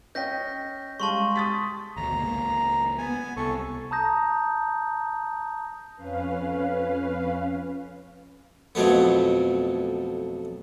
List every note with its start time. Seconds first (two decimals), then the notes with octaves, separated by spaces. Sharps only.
0.15 C#4 D#5 G5 G6 A#6 B6
1.00 G3 G#3 F5 A5 C6 C#6
1.35 D#6 A6 B6
1.97 G#1 D2 B2 A#5
2.15 C#2 A#3
2.98 B3 G#5
3.37 C2 A4 C#6
3.91 A5 A#5 D#6 G6 A#6
5.96 F2 C#4 B4 F5
8.75 F2 B2 F#3 A3 B3